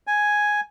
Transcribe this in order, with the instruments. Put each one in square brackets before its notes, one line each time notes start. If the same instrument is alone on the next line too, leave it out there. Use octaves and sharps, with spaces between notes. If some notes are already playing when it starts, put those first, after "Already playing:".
[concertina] G#5